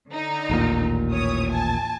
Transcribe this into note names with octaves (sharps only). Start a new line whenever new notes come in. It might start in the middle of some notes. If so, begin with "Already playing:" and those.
D3 D#4
A1 D#2 A#2
E3 C#5 D#6
G#5 A5